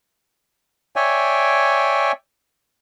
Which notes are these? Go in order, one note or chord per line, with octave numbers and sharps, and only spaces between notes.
C#5 D5 E5 G5 G#5